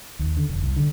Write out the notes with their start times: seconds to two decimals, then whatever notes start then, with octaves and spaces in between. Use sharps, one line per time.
0.19 D#2
0.37 D3
0.49 F1
0.62 C2
0.76 D3